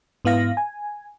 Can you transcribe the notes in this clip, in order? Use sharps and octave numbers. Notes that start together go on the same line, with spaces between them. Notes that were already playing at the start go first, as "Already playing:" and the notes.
G#2 B3 E4 F5 A#6
G#5